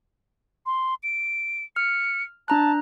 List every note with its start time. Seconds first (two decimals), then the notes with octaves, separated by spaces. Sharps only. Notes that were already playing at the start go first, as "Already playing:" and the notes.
0.66 C6
1.03 D7
1.76 F6 C#7
2.48 D4 A5 A#5 F#6